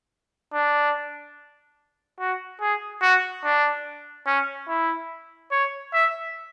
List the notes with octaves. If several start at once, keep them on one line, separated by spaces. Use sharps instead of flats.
D4
F#4
G#4
F#4
D4
C#4
E4
C#5
E5